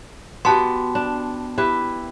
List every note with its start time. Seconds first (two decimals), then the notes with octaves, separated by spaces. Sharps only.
0.45 B3 F#4 G4 A5 C6
0.95 D4
1.58 E4 G4 B4